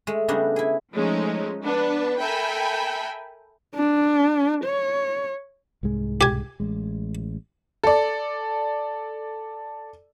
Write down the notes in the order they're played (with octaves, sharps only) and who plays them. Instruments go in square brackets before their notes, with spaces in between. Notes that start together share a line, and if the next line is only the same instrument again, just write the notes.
[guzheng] G#3 A3
C#3 G3 A3 B3 D4 D#4
E4 G#4
[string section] F3 G#3 A3 C#4 D#4
B3 D4 B4
A4 A#4 E5 G5 G#5 B5
[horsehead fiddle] D4
C#5
[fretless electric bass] C2 G#2 G#3
[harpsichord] G4 G#5
[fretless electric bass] A1 G#3
[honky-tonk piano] A4 D5